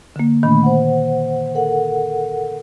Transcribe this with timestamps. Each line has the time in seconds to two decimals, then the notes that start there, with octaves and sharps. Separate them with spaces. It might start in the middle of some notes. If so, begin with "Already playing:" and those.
0.16 D3 A#3
0.43 A#2 D#3 A3 D4 B5
0.63 C5 F#5
1.55 A4 A#4 F#5